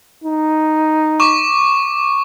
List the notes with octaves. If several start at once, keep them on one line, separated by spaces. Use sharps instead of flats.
D#4
C#6 D6